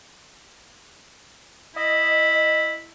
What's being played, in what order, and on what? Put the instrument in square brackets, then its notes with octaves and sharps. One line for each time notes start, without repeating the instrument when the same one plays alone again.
[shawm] E4 [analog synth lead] D#5